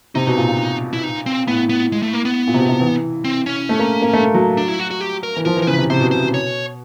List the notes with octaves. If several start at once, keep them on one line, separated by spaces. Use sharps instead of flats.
C3 D#4
B2
A#2
A#2
E4
D#4
C4
A2 B3
B3
G#3
A3
A#3
B3
A#2
C3
B2
C3
E3
C4
C#4
A3
A#3
A#3
A3
F#3
D4
E4
F#4
F#4
G4
A#4
E3
F3 A#4
E3
A#4
C#3 B4
C3
C3 C5
B2
B2 C5
B2
C#5